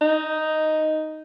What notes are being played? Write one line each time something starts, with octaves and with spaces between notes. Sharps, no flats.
D#4